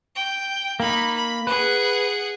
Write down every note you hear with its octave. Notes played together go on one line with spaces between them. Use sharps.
G5
A#3 D#4 B5
B5
G#4 B4 F#5